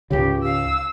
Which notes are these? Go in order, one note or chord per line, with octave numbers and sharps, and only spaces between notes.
C#2 G#2 C#3 G4
F5 E6